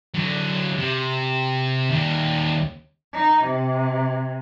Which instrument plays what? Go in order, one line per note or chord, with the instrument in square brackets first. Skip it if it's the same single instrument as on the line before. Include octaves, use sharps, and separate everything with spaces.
[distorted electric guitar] D3 F#3
C3
D#2 G3
[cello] D#4
C3